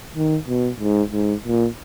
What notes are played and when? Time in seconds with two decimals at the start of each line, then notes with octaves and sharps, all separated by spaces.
0.15 D#3
0.47 B2
0.80 G#2
1.11 G#2
1.44 A#2